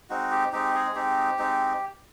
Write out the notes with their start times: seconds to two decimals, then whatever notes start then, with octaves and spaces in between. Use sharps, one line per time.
0.10 G#3 C4 D#4 F#4
0.31 G4
0.52 G#3 C4 D#4 G4
0.75 G#3 G#4
0.95 G#3 C4 D#4 G4
1.39 G#3 C4 D#4